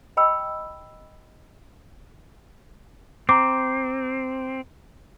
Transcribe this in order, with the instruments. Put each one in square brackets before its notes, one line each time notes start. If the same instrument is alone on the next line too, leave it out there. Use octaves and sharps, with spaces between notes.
[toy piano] D#5 G5 B5 E6
[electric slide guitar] C4 [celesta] A#5 D6